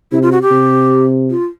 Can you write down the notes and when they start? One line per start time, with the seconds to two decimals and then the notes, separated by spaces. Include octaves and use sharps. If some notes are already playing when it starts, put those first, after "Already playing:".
0.12 C3 E4
0.22 F4
0.32 F#4
0.42 G4
0.51 C3
1.30 F4